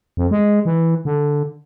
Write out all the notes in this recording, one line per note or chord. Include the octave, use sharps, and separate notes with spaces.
F2
G#3
E3
D3